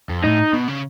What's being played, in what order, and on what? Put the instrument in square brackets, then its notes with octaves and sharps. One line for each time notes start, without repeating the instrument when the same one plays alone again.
[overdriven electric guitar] F2
[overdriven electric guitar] A2 [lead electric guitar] D#4
[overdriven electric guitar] B2
C#3